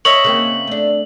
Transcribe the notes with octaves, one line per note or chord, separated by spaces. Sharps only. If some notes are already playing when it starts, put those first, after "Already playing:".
C#5 D#5 E5 F#7
C#3 A#3 C4
A3 D4